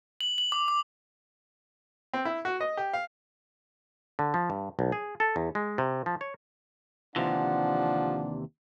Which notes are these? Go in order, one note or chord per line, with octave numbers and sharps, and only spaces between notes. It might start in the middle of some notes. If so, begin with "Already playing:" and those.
F#7
F#7
D6
D6
C4
E4
F#4
D#5
G4
F5
D3
F3
G2
B1
G#4
A4
E2
G#3
C3
F3
C#5
D#2 C3 E3 F3 D4 F#5